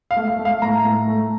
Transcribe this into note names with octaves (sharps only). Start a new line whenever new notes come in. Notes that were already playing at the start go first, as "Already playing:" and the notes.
F5
A3
F5
A3
F5
A2 A#5
A2
A3